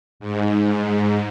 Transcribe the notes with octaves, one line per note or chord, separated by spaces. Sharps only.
G#2